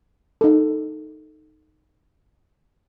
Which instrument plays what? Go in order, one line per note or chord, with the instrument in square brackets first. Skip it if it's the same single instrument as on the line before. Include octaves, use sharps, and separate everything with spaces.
[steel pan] D#4 A4